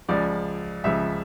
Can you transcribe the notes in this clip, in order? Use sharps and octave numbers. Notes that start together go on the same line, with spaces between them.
C#2 C#3 F3 D5
C#2 C#3 F3 E5